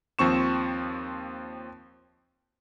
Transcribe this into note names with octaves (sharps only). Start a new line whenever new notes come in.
D#2 F3 C4 C#6 E7